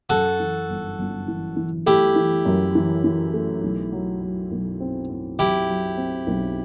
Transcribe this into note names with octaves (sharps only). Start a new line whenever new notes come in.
F#2 F#4 A4
E3
G1
G1
E3
E3
A3 E4 G4
E3
F#2
E3
E3
A3
B1
F#3
F#3
B1
C4
C4
F#3 E4 G4
F#3
C4
B1